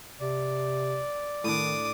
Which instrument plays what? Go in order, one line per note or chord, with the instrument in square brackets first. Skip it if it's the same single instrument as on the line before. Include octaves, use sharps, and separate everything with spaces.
[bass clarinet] C3 [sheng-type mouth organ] D5
[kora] A2 D4 [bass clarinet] D#3 [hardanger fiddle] D6 D#6